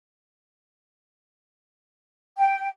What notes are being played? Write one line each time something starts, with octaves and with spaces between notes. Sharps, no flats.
G5